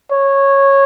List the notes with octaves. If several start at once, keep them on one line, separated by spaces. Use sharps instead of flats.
C#5